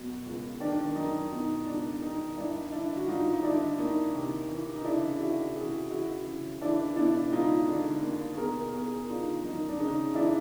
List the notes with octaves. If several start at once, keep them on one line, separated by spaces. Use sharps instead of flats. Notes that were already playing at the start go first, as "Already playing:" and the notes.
Already playing: F#2 B2 F#4
C#2
D#3 D4
F#2 D#4
B2 D#4
C#2 D4
D#3 D#4
G2 D4 E4
D3 D4 E4
F#4
G2 D#4 F4
D#4
D3 D4 E4
D#2 D#4
C3
E3
D#4
C#3 D4 E4
E3 E4 F#4
C3 F#4 G#4
E3 E4 F#4
C#3
E3 D4 E4
B2 D4 E4
C#2 D#4 F4
D3
D#2
B2 G#4 A#4
E2 G#4 A#4
D3 D#4 F4
F#2 D#4
D4
C#3 D#4
E3 D4 E4